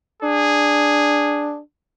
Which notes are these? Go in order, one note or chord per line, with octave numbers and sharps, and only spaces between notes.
D4 G#4